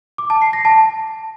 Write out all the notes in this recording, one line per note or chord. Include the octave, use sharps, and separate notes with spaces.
D6
A5
C7
A#6
A5